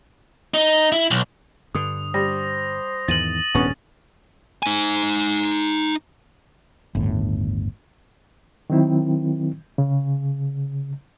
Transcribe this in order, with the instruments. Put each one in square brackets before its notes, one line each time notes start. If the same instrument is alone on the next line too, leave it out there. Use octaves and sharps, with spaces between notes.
[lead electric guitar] D#4
E4
B1
[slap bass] G2 D3 [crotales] D#6
[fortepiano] G3 [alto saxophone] C5 [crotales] A#6
[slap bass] E2 G#2 D#3 [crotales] A6 D#7 F#7
[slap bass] D#1 G#2 [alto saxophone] B3 [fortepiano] C#4 C#6
[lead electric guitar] D#4 G#5
[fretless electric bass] G1 D#2 A2
[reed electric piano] D#3 F#3 C4 E4
C#3